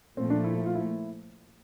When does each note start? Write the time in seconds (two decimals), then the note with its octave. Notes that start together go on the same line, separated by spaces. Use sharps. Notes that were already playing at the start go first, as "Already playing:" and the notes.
0.17 A#2 F3 A3 C4
0.30 D4
0.44 E4
0.57 E4
0.66 F4
0.75 E4